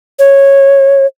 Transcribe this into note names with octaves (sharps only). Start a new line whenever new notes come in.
C#5